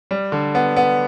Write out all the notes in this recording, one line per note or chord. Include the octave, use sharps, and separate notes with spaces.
G3
D3
B3
B3